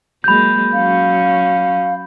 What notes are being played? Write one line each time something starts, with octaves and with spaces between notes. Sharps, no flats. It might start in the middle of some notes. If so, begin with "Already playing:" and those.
F#3 G#3 A#3 B5 G6
F#3 C#4 F5